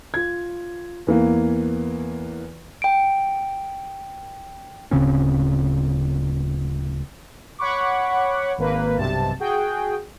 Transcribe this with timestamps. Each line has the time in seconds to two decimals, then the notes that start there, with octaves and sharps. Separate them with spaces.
0.14 F4 G#6
1.07 E2 E3 A#3
2.82 G5 D7
4.91 D1 C#3 C4 C#4
7.59 C#5 F#5 B5 C#6 D6
8.58 G#1 A#3 B4
8.97 B1 G2 C3 A5
9.40 F#4 G#4 G5